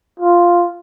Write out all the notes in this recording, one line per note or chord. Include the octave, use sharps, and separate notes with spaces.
F4